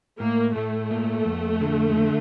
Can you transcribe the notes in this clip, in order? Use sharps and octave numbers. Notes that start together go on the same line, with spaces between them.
A2 A#3
A2 A3
A#3
F2
D3
D3